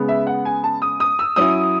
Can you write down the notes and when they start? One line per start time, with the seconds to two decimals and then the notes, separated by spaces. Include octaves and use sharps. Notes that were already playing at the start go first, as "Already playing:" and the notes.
Already playing: C#3 G#3 B3
0.08 E5
0.27 F#5
0.45 G#5
0.64 A5
0.82 D#6
1.00 D#6
1.19 E6
1.36 F#3 C#4 E4 D#6